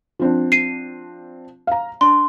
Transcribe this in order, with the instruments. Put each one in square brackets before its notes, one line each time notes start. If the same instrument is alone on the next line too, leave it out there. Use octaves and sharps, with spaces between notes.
[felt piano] F3 C4 D4
[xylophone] C7 D#7
[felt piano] F5 A#5
[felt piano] D4 [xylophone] C6